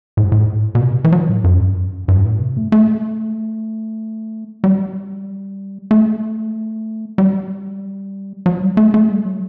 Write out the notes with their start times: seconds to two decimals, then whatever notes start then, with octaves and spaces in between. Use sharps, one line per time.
0.17 A2
0.24 G2
0.32 A2
0.75 B2
0.81 C3
1.04 E3
1.12 F#3
1.29 A2
1.44 F#2
1.57 G2
1.70 F#2
2.08 G2
2.25 A2
2.40 C3
2.57 A3
2.72 A3
4.64 G3
5.91 A3
7.18 G3
8.46 F#3
8.62 G3
8.77 A3
8.94 A3
9.10 G3
9.25 F#3